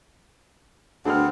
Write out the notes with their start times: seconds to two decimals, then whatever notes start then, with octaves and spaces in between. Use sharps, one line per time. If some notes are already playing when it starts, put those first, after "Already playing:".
1.05 D2 B3 C4 D4 G#4 A4 F6